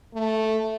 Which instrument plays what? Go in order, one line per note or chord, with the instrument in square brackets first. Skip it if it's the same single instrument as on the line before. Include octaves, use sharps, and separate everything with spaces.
[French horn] A3